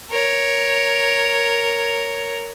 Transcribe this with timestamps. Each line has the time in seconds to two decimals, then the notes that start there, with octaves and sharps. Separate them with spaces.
0.11 A#4 C#5